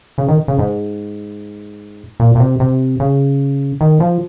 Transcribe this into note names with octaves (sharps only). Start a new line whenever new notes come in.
C#3
D#3
C#3
G#2
A#2
A#2
C3
C3
C#3
D#3
F3